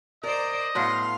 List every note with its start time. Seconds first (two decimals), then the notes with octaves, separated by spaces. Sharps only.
0.23 A#4 C5 D5 D#5
0.75 A2 F#3 B3 F5 C6